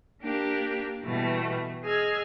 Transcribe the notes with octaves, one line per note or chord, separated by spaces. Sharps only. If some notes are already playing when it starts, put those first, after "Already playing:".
A#3 D4 G4 A#4
B2 E3 G3 A3 B3
G#4 D#5 E6 F6 G#6